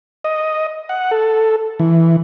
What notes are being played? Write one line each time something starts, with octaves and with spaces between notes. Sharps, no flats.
D#5
F#5
A4
E3